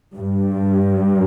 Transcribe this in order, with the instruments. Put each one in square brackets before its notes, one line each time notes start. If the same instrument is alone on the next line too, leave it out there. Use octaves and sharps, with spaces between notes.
[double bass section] G2